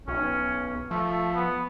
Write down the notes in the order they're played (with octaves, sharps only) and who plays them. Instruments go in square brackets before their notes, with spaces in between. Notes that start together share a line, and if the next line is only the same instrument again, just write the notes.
[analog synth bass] B1 [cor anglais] C#4
[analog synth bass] F3 [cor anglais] A3
[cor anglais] B3